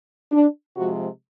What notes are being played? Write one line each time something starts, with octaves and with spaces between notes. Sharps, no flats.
D4
C3 F3 G#3 F#4